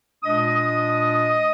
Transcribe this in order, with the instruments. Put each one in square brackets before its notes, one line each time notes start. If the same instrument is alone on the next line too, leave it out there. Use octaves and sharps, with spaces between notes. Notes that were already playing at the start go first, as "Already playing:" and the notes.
[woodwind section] A#2 G#3 D4 D#5 D#6